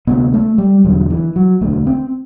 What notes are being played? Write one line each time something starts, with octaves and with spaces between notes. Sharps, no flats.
D2 C3 B3
A3
G3
E1 E2 D3 F#3
E3
F#3
E1 D2 D3 A3
C4